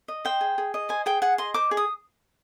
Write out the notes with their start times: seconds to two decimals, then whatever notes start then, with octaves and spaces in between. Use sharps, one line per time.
0.08 D#5
0.25 C5 G5
0.41 G#4
0.58 G#4
0.74 D#5
0.89 C5 G#5
1.06 G#4 G5
1.22 G#4 F#5
1.38 D#5 C6
1.54 C5 D6
1.71 G#4
1.77 D#6